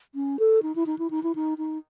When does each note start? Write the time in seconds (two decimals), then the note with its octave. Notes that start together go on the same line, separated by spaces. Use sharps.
0.15 C#4
0.39 A4
0.63 D#4
0.76 E4
0.86 D#4
0.99 E4
1.11 D#4
1.23 E4
1.35 D#4
1.58 D#4